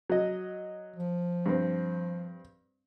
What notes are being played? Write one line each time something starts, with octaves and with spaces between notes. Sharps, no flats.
F#3 D#5
F3
G2 C4